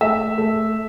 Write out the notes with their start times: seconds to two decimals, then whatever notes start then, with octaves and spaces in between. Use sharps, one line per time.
0.01 A3 E5
0.38 A3